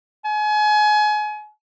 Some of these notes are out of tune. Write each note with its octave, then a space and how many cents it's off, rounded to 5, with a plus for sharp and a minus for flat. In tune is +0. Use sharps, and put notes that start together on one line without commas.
G#5 +30